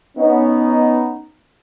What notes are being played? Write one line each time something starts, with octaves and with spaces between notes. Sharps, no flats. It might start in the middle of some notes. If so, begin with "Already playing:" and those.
B3 C#4 D#4